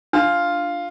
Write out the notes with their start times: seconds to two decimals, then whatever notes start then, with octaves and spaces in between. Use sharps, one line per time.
0.13 D4 F4